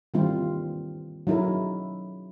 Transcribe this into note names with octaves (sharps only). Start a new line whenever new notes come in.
D#3 E3 G3 C4 F4
F#3 D#4 E4 G#4 A#4